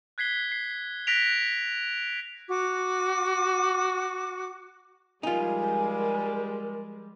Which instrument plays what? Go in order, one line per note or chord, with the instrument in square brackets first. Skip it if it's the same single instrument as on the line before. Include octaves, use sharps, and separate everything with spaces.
[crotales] F#6 G#6 B6 C7 G7
C7
F#6 A#6 B6 D7 F7
[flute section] F#4 D6
[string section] F3 G3 G#3 [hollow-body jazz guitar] D#4 F4 [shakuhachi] A#4 [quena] G#5